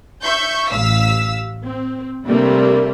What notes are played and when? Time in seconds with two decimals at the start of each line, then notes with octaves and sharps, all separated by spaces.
0.23 E5 C#6 G6
0.71 A1 F5 E6 B6
1.65 C4
2.27 C3 G3 A3 A#3 D4